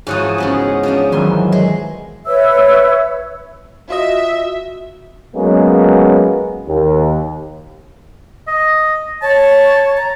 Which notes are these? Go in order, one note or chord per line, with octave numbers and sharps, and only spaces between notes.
G#2 E3 F3 F#4 C#5 D#6
C#3 G#3 B3
F3 C#4 D4
D#3 E3 F#3 G#5 C6
G#3
B4 C#5 E5 E6
F4 F#4 D#5 E5
F#3 G#3 A#3 B3 C#4
D#2
D#5
C#5 A5
A#5